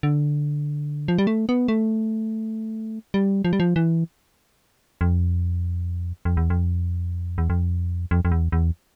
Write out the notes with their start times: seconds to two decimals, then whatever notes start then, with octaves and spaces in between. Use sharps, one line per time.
0.03 D3
1.08 F3
1.18 G3
1.27 A3
1.49 B3
1.68 A3
3.14 G3
3.45 F3
3.53 G3
3.60 F3
3.76 E3
5.01 F2
6.25 F2
6.37 E2
6.50 F2
7.38 E2
7.50 F2
8.11 F2
8.25 F2
8.31 E2
8.52 E2